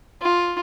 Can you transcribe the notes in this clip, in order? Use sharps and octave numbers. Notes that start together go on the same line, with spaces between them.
F4